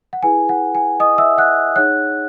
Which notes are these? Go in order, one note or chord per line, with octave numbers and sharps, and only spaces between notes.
F#5
E4 G#4 B4 G#5
F#5
G#5
D#5 D#6
E5 E6
F#5 F#6
D#4 G#4 C#5 F#5 F#6